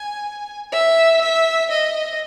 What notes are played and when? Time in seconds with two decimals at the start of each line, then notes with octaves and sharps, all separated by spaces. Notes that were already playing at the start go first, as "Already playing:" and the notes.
Already playing: G#5
0.72 E5
1.21 E5
1.71 D#5